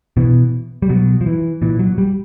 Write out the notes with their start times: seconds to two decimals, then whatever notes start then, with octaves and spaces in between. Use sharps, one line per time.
0.17 B2 E3
0.82 G3
0.89 B2 F#3
1.21 F3
1.26 E3
1.62 A#2 E3
1.79 F#3
1.98 G3